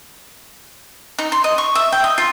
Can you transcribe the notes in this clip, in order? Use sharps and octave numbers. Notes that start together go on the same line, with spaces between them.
D#4
C6
D#5
C#6
E5
G5
D#5
F4